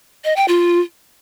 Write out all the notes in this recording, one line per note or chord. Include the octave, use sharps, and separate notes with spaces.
D#5
G5
F4